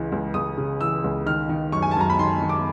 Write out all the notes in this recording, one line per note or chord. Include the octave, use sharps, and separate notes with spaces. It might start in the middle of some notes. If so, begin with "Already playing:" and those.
Already playing: C#2 C#3 E3
C#2
C#2 D#6
C#3
E3 E6
C#2
D#3 F6
D#3
F#2 C#6
G#5
A5
F#2 A#5
B5
D#3 C6
D#3
D6